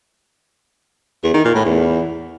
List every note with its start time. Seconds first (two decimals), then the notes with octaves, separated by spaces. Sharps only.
1.24 E2
1.34 D#3
1.45 A#2
1.55 A2
1.65 E2